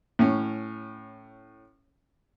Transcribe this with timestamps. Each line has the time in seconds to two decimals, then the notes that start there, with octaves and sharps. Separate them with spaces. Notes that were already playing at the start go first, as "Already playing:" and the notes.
0.19 A2 C#4